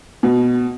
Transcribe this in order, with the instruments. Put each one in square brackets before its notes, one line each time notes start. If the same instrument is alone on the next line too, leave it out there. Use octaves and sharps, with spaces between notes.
[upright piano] B2